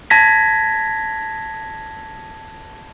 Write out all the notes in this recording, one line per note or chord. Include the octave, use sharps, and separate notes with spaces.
A5 G#6 A#6 B6